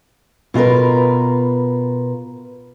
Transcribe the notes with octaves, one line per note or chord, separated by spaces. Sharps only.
B2 F4 G#4 A#4 B4